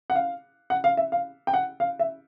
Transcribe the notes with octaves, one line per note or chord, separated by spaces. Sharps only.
F#5
F5
F#5
F5
E5
F5
G5
F#5
F5
E5